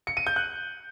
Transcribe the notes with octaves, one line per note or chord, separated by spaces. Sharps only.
C#7
D#7
G6
F#6